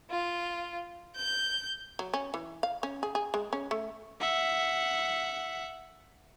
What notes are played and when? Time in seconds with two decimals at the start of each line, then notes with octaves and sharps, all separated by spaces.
0.10 F4
1.16 G6
1.99 F#3
2.14 C#4
2.34 E3
2.63 F5
2.83 C#4
3.03 G#4
3.15 G#4
3.34 G#3
3.53 C#4
3.71 A3
4.21 E5 F#5